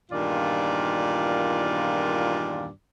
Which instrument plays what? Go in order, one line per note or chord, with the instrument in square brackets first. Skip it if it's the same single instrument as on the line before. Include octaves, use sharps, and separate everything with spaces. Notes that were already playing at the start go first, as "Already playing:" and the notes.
[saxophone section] E2 G2 A#2 D#3 F4 D5